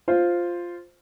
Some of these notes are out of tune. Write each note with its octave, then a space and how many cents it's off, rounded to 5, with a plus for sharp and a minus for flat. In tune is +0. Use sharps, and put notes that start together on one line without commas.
F4 +0 C5 +0